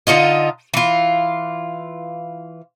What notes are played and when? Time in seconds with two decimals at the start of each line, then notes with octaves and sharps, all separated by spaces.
0.07 D3 D#4 F4 D#5
0.74 E3 F4